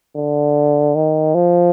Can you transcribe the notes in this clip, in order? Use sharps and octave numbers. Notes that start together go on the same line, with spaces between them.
D3
D#3
F3